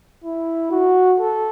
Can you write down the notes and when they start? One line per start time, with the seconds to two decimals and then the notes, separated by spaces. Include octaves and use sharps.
0.24 E4
0.71 F#4
1.20 A4